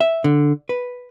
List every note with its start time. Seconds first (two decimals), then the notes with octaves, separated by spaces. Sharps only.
0.01 E5
0.24 D3
0.69 B4